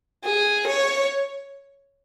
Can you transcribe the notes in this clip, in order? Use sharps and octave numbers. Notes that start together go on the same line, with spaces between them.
G#4
C#5